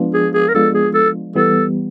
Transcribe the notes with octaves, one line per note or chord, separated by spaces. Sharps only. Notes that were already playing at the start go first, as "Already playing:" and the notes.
Already playing: F3 G#3 B3 D4 F4
G#4
G#4
A#4
F3 G#3 B3 D4 F4 A4
G#4
A4
E3 G3 B3 A4